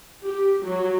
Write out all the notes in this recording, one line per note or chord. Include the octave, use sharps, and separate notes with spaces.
G4
F#3